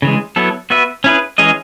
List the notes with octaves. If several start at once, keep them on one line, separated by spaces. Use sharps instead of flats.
C#3 E3 G#3
F#3 B3 E4 A4
B3 F#4 B4 E5
C#4 E4 G#4 B4
E3 G#3 C#4 G#4 D#5